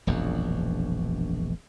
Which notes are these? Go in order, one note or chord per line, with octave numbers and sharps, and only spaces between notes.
E1 A#1 F#2